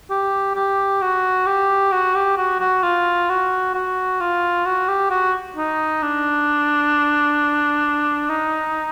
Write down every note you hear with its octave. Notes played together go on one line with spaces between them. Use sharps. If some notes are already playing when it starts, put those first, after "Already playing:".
G4
G4
F#4
G4
F#4
G4
F#4
F#4
F4
F#4
F#4
F4
F#4
G4
F#4
D#4
D4
D#4